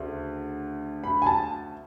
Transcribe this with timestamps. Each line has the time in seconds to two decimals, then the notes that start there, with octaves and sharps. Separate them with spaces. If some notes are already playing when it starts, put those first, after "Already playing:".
Already playing: D2 C#3
1.04 B5
1.22 G#5
1.26 A5